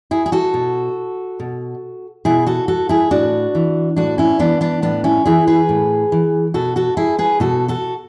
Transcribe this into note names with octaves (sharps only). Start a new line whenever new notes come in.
E4 G#4
G#4
F#4 A4
B2
B2
B2 E4 G#4
F#4 A4
F#4 A4
E4 G#4
A2 D4 F#4
E3
A2 D4 F#4
C#4 E4
E3 B3 D4
B3 D4
A2 B3 D4
C#4 E4
E3 E4 G#4
G#4 B4
A2
E3
B2 F#4 A4
F#4 A4
E4 G#4
G#4 B4
B2 F#4 A4
F#4 A4